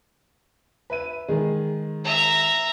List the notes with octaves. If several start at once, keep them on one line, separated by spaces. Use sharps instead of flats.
B4 E5 D#7
D#3 G#3 G#4
E5 A#5